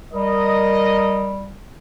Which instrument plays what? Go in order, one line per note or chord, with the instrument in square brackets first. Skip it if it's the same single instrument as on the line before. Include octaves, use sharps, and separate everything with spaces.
[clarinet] G3 [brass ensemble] A#4 D#5